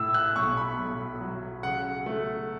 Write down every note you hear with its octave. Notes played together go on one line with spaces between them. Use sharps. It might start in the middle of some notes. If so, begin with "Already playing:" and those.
Already playing: A2 E6
F#6
B1 C#6
B5
B1
F#3
C#3 F#5
A3